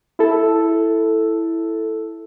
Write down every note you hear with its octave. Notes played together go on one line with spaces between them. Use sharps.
E4 A4